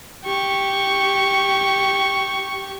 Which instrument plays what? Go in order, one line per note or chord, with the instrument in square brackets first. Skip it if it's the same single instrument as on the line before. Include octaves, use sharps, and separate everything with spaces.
[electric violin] G4 C#6